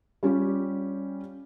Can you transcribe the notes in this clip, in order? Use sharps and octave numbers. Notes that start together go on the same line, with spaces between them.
G3 C#4 F4 G4